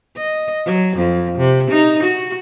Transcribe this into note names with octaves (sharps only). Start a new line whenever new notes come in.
D#5
F#3
F2
C3
D#4
F#4